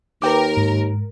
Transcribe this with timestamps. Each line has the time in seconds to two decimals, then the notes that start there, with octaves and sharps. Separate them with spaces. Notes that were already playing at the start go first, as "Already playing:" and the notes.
0.22 D#2 A#4 B4 G5 D6
0.57 G#2